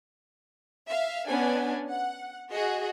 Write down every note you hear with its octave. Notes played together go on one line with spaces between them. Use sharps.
E5 F5
B3 C#4 D4 G#5
F#5
F#4 G#4 D#5